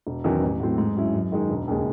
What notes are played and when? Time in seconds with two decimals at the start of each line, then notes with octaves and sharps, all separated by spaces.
0.07 E1
0.24 E2 D#3 F#3 C#4
0.42 A1
0.60 A2 F#3 C4
0.78 G#2
0.96 F#3 C#4 E4
1.14 F#2
1.32 D#3 G#3 D#4
1.49 E1
1.68 D#2 C#3 G#3